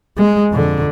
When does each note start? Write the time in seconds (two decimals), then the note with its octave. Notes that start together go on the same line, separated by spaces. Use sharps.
0.18 G#3
0.51 F2 D3